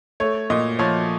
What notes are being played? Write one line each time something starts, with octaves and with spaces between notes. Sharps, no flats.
A3 C#5
A#2 D#5
F3 C#5